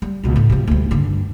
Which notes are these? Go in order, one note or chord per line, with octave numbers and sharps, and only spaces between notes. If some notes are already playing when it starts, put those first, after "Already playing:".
G3
C#2 B2
A2
C3 F3
D2 G3
G2 D3